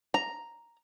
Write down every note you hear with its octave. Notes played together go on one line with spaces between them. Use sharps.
A#5